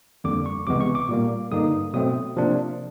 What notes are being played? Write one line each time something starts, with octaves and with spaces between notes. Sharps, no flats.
F2 D3 G3 A#3 D6
C#6
C#2 C3 E3 G#3 B3 D6
C#6
D6
A#2 G3 A#3
G2 D3 G3 A#3 D#4 D#6
B2 F#3 A3 C4 D#6
C3 F3 A#3 D4